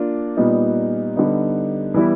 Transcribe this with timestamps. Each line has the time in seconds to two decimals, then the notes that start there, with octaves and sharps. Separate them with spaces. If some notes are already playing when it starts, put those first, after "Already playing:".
Already playing: A#3 D4 F4
0.37 A#2 G3 B3 D#4
1.16 D3 G3 B3 D#4
1.94 E3 G3 B3 E4